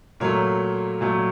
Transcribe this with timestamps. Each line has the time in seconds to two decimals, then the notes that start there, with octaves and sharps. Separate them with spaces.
0.20 A#2 F#3 A3 A#4 C#5
1.01 A#2 F#3 A3